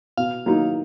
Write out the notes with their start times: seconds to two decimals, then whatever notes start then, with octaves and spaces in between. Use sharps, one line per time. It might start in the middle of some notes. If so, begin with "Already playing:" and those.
0.17 B2 F5
0.46 F#3 A#3 D#4